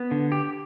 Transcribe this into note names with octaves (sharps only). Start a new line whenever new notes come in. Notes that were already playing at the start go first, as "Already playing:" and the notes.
Already playing: B3
D3
G4